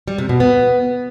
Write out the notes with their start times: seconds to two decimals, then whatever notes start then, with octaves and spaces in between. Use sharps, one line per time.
0.08 G3
0.18 C3
0.29 B2
0.40 B3